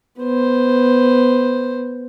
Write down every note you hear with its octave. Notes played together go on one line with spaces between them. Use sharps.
B3 C5